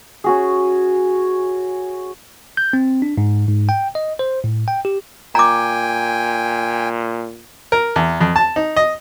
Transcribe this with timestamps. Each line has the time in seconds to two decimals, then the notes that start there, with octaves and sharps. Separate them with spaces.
0.24 C#4 F#4 G#4
2.57 G6
2.73 C4
3.02 D4
3.18 G#2
3.48 G#2
3.69 G5
3.95 D#5
4.19 C5
4.44 A2
4.68 G5
4.85 G4
5.35 A#2 G5 G#5 A#5 D6
7.72 A#4
7.96 E2
8.21 F2
8.36 A5
8.56 D#4
8.76 D#5